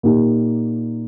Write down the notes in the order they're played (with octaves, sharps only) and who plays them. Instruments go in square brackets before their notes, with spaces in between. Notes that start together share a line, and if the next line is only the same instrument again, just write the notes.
[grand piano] A#2 A#3 D#4 G4